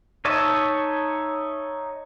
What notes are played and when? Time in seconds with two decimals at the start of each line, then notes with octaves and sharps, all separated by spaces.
0.25 D#4 C#5 D#5 E5 A5